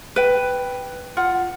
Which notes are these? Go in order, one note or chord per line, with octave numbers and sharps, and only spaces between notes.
B4 G5
F4 F#5